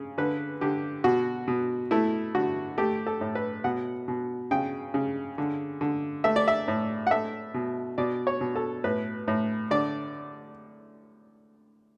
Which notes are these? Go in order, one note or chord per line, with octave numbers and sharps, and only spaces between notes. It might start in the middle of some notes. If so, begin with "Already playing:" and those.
Already playing: C#3
D3 B4
D3 G4
B2 F#4
B2
A3 E4
D3 F#4
A3 G4
A4
A2
B4
B2 F#5
B2
C#3 G5
C#3
D3
D3
A3 E5
D5
E5
A2
F#5
A3 E5
B2
B2 D5
C#5
B2
A4
A2 B4
A2
D3 D5